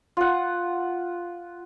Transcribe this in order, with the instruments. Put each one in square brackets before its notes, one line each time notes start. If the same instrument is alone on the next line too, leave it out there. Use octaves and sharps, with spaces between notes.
[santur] F4 F#5